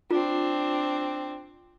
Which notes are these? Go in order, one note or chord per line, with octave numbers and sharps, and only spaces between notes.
C4 D4 F4